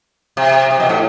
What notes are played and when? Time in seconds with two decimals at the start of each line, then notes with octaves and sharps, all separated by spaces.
0.37 C3
0.71 C3
0.80 B2
0.89 A2